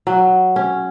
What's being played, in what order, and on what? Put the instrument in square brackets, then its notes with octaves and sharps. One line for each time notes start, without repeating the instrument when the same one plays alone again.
[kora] F#3
C#4